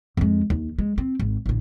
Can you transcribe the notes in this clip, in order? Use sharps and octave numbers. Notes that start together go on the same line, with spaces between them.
F2 G#3
D#2
G#3
C4
G#1
A1 D3